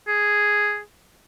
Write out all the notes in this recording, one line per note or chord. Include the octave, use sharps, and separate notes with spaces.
G#4